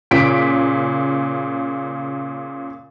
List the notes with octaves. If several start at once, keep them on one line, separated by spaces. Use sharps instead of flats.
A#2 C#3 B6 D7